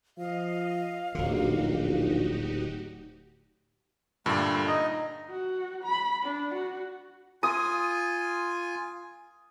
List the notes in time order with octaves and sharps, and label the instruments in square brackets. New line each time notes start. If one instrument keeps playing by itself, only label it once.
[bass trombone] F3 [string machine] D#5 [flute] F5
[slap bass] D1 D3 [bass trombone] A#1 [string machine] D#4 F#4 G4
[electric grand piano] G2 A#2 D3 [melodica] G3 A3
[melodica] D#4 D#5
[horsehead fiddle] F#4
B5
D4
F#4
[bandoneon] F4 G#5 [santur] D#6